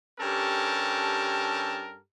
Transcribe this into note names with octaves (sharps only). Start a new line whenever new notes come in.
G2 C#4 G4 A4 A#4 A5